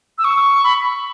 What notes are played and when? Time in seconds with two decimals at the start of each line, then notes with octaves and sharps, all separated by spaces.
0.18 E6
0.24 C#6
0.64 B5